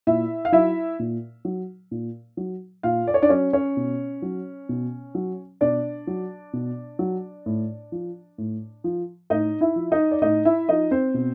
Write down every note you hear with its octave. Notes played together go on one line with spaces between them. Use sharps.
A#2 E4 E5
F5
F#3 E4 E5
A#2
F#3
A#2
F#3
A#2 F4 F5
D5
C#5
D4 D5
F#3 C#4 C#5
C#4 C#5
B2
F#3
B2
F#3
B2 D4 D5
F#3
B2
F#3
A2
F3
A2
F3
A2 D#4 D#5
E4 E5
F3
D#4 D#5
D5
A2 D#4 D#5
E4 E5
F3 D#4 D#5
C4 C5
B2